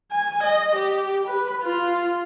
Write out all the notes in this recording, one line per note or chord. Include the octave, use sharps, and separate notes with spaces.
G#5
D#5
G4
B4
F4